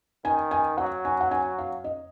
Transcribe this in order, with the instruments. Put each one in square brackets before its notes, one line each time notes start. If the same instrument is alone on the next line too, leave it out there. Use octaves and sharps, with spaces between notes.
[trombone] D#3 [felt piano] G#5
[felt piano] G#5
[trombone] F#3 [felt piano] F#5
[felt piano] G#5
F#5
G#5
F5
D#5